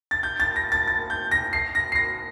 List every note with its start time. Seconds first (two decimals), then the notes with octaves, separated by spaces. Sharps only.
0.11 A6
0.23 G6
0.40 A6
0.56 A#6
0.72 A6
0.87 A6
1.10 G6
1.31 A#6
1.53 C7
1.75 A#6
1.92 C7
1.95 A#6